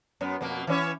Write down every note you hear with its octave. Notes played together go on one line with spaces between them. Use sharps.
F#2 B3
F2 B2 A#3
E3 C#4 C#5